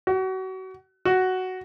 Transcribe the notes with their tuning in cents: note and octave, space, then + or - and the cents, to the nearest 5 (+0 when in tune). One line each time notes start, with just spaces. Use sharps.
F#4 +30
F#4 +5